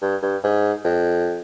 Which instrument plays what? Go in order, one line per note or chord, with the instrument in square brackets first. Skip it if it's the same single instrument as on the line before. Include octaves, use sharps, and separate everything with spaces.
[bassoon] G2
G2
G#2
F2